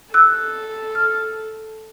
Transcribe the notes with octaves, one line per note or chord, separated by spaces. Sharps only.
A4 E6 F#6
F6